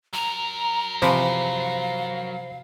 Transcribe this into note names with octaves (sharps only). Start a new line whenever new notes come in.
F#3 A#4 A#5
C3 E3 F3 C5 F5 B5